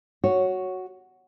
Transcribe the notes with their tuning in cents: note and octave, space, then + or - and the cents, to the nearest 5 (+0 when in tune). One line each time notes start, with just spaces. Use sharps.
F#4 +0 C#5 +0